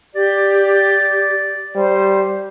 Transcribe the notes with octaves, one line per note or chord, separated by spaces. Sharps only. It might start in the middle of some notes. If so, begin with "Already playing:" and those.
G4 D5
G3 C5